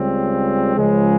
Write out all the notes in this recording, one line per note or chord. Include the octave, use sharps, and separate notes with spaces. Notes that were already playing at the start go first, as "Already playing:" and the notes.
Already playing: C#2 C#3 G3 C4
C#2 C#3 F3 G#3